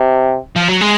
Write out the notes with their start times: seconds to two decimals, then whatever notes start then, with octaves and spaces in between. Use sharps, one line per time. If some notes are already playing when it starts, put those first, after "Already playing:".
Already playing: C3
0.56 F3
0.68 F#3
0.81 G#3